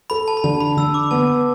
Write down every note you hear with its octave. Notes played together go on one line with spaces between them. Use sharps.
A4 B5
A5
B5
D3 A5
B5
D3 E6
D6
B3 A5